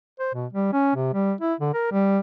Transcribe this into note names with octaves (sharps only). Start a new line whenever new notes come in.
C5
B2
G3
C#4
C3
G3
E4
D3
A#4
G3